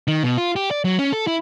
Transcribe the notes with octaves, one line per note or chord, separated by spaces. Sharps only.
D#3
B2
F4
G4
D5
F#3
C#4
A4
E4